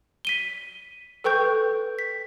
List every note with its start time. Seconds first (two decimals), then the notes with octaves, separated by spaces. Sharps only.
0.25 B6 D#7 G7
1.24 A4 B4 G5 C#6 G6
1.99 B6